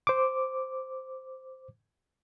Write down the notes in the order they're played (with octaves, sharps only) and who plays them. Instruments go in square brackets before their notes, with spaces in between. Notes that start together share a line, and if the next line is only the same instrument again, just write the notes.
[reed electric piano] C5 D6